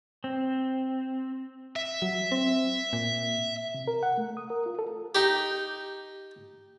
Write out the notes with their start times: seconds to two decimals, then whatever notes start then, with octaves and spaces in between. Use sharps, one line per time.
0.24 C4
1.76 E5
2.02 F#3
2.32 C4
2.93 A#2
3.74 C3
3.88 A#4
4.03 F#5
4.18 A3
4.37 D#6
4.50 A#4
4.66 F4
4.79 A4
5.15 D#4 G4